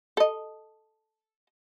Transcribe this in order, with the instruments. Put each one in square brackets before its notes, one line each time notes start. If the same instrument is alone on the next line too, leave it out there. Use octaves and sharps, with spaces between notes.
[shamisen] A4 D#5